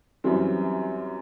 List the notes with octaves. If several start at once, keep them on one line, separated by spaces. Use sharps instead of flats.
F#2 E3 G3 C4